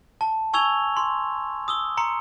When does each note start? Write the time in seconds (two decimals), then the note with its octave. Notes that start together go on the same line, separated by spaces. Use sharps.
0.21 A5
0.53 G#5 C#6 E6 G#6 F7 G7
0.97 C6
1.68 D#6 E6 G7
1.97 A#5 C6 C#7